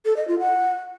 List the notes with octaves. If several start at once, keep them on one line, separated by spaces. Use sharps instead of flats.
A4
D#5
F4
F#5